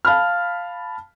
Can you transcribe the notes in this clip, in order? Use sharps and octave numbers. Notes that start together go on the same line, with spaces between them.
F5 A5 B5 F6